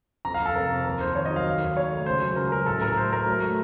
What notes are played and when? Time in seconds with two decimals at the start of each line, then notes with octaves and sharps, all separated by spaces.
0.25 F2 A#5
0.34 F5
0.40 F2
0.45 A4
0.55 C3 A#4
0.71 F2
0.86 D#2 A#4
1.01 D#2 C5
1.15 D#3 C#5
1.25 D#5
1.30 F#3
1.36 F5
1.46 D#2
1.61 D#2
1.76 D#2 C#5
1.91 A3
2.06 C#2 C5
2.22 F#3
2.36 C#2 A#4
2.52 F#3 A#4
2.66 A2 A4
2.81 A2 A#4
2.97 A3 C5
3.12 A3 A#4
3.27 F#3
3.42 A3